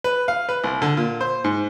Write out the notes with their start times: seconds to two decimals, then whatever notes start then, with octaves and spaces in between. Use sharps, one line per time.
0.04 B4
0.28 F5
0.49 B4
0.64 C2
0.82 D3
0.97 A#2
1.21 C5
1.44 G#2